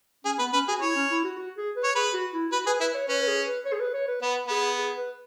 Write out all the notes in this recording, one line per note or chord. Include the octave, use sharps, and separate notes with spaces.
C#4 G#4
B3 B4
C#4 B4
F#4 G#4
E4 C#5
C#4
E4
F#4
F#4
G#4
B4
C#5
G#4 B4
F#4
E4
F#4 B4
G#4 B4
E4 B4
C#5
C#4 B4
B4
G#4
B4
C#5
G#4
B4
C#5
B4
B3 B4
B3 G#4
G#4
B4